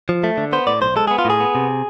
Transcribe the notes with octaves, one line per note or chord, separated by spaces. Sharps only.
F3
A3
D3
B3 C5
A2 D5
B1 C5
G#3 A4
B3 G#4
F4
A2 G#4
B3
C3